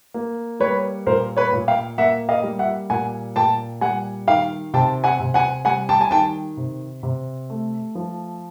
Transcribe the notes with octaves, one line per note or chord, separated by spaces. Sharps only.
A#3
G3 B4 C#5
A#2 A#4 C5
B4 C#5
A#2
F5 G5
A#3 E5 F#5
D#5 F5
G3
E5 F#5
A#2 F#5 G#5
A#2 G5 A5
G3 F#5 G#5
D#3 F5 G5
C3 G5 A5
F#5 G#5
C3
F#5 G#5
G3 F#5 G#5
G5 A5
G#5
D#3 G5 A5
C3
C3
A3
F3